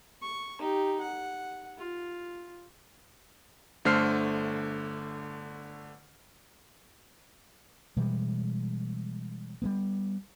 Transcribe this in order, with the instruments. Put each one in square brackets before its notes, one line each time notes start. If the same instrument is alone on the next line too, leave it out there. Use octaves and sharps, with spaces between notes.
[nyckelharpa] C#6
D#4 G4
F#5
F4
[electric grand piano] G1 D3 A3 C5 F6 C7
[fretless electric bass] B2 E3 G3 G#3
G3 A#3 B3